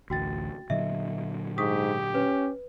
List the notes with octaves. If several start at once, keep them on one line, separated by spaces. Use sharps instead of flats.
A1 D2 F#4 G5 A6
A#2 D3 F#3 D#5 E5
G#2 G4 C#6 D#6 B6
C#4 B4